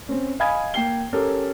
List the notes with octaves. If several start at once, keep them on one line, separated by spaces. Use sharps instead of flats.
C4 C#4
D#5 F5 G#5 B5 D#6 G#6
A#3 G5 C7 G7
C#4 G4 A4 A#4 C#5